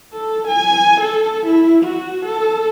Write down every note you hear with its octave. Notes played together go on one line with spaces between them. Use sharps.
A4
G#5
A4
E4
F#4
A4